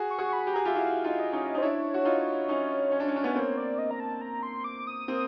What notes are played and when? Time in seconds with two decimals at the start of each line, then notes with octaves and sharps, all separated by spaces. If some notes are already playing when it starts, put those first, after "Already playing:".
Already playing: F#4 G#4
0.10 C#6
0.19 F#4 G#4
0.33 B5
0.47 G4
0.54 G#4 A#5
0.65 F4 G4 E5
0.76 E4 F#4 F5
1.04 D#4 F4
1.20 D#5
1.33 C#4 D#4
1.55 D#4
1.58 C5
1.62 D4 E4 C#5
1.94 F#4
2.05 D#4 F4
2.48 C#4 D#4
2.92 C#4
3.00 D4
3.08 C#4
3.16 D4
3.24 B3 C#4
3.35 A#3 C4 C#5
3.57 D5
3.78 D#5
3.91 A#5
4.00 A5
4.21 A#5
4.43 C6
4.64 D6
4.87 D#6
5.08 A#3 C4